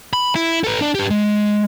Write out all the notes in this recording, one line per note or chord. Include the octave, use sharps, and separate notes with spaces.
B5
E4
A4 B4
D4 D5
G4 B4
G#3